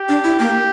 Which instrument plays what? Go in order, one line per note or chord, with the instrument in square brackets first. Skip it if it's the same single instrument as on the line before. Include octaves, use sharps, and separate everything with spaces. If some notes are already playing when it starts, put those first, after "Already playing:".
Already playing: [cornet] G4
[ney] D4
E4
[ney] A#3 [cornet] G4